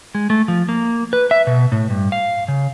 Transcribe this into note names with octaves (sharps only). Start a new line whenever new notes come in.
G#3
A3
F3
A#3
B4
E5
B2
A2
G2
F5
C#3